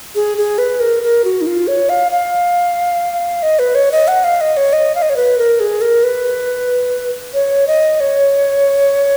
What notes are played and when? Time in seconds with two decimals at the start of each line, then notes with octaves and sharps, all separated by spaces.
0.15 G#4
0.37 G#4
0.58 B4
0.80 A#4
1.03 A#4
1.25 F#4
1.41 D#4
1.47 F4
1.68 C#5
1.89 F5
2.11 F5
3.43 D#5
3.59 B4
3.75 C#5
3.92 D#5
4.08 F#5
4.24 F5
4.41 D#5
4.57 C#5
4.73 D#5
4.95 F5
5.02 D#5
5.10 C#5
5.17 B4
5.38 A#4
5.60 G#4
5.81 A#4
6.03 B4
7.34 C#5
7.67 D#5
8.00 C#5